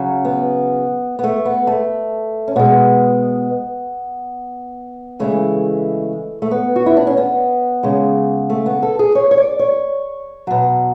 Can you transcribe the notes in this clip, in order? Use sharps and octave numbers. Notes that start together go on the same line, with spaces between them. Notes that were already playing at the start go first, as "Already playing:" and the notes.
Already playing: C#3 F#3
B3
B3
A3
B3
A3
C#4
B2 G#3 B3
C#3 E3 G#3 A3
A3
B3
F#4
E4
D4
C#4
B3
C#3 G#3
A3
B3
A4
G#4
C#5
C#5
D5
C#5
B2 F#3